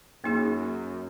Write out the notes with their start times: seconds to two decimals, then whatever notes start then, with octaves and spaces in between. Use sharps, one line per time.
0.24 F#2 A#3 D#4 G#4